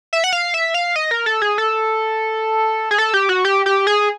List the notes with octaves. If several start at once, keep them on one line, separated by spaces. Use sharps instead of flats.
E5
F#5
F5
E5
F5
D#5
A#4
A4
G#4
A4
G#4
A4
G4
F#4
G4
G4
G#4